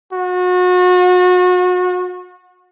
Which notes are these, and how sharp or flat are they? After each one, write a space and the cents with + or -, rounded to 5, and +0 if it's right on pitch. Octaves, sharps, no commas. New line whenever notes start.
F#4 -35